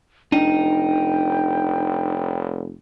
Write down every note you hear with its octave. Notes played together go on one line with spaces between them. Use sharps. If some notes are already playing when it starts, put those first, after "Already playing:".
F1 D4 D#4 G5